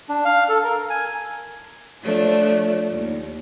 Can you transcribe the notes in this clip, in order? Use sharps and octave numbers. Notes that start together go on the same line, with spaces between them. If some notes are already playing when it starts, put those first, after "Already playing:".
D4
F5
A4
A#4
G#5
F3 A3 D4 C#5
D#2